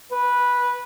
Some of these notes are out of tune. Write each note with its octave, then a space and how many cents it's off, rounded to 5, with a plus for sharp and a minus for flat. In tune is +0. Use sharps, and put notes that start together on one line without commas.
B4 -10